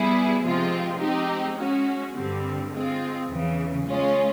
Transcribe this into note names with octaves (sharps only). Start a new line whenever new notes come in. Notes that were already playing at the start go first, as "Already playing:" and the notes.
Already playing: G3 B3 E4 G#4
C3 F3 G#3 C4 F4
G#3 C4 D#4 G4
G#3 C#4 F#4
G2 D3 G3 C4
G#3 C4 F4
E2 C#3 E3
G#3 C#4 F4